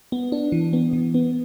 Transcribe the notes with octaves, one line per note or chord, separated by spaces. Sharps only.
B3
D4
E3
B3
E3
B3